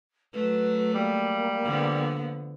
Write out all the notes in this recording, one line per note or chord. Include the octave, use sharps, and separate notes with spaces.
F#3 A3 B4
G3 A#3
D3 F3 B3